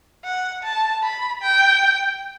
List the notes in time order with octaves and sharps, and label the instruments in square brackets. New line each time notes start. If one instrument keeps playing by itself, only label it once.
[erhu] F#5
A5
B5
G5